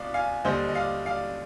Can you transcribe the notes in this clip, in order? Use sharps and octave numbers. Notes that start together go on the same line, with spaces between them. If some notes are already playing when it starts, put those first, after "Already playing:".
Already playing: C2 B2 B3 D5 F5
F5 G#5
D#2 D3 G3 D4 C5 D#5
D#5
D5 F5
D5 F5